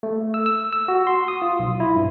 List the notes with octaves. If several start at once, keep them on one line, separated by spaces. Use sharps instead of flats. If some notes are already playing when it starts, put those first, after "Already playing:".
A3
E6
E6
E6
F#4
C6
D#6
F4
B1
E4
G2